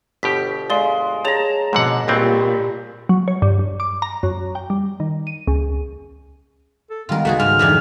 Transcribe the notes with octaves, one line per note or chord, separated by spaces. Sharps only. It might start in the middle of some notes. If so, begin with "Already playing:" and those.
G1 B2 G4 B6
G#3 D5 F5 C6
G#4 C#5 A5 A#5 F7
G#2 B2 D3 F#5
C#2 A#2 F#3 G3 C4
F#3
C#5
G2
G2
D6
A#5
F#2
G5
G3
D#3
D#7
C#2
A4
D#3 G3 G#3 B3 F4 A#4
C#2 A3 F#4 G#4 F#6
G#2 F6
F1 D#3 E3 D4 B6